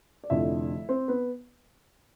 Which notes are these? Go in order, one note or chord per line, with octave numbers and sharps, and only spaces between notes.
D5
F1 F2 D3 F3 E4 E5
C4 C5
B3 B4